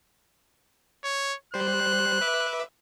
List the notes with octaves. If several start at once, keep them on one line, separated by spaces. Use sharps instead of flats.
C#5
G3 C5 F#6
B4 E5 D6